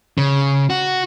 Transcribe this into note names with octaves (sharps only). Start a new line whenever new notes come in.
C#3
F#4